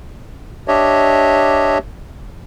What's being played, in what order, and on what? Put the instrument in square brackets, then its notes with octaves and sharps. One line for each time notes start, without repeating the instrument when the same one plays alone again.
[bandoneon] D4 G4 C#5 D#5 E5